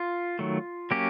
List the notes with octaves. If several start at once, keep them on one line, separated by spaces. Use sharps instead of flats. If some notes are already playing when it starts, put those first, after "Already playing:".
Already playing: F4
D#3 F#3 A3
F#3 A#3 C#4 G4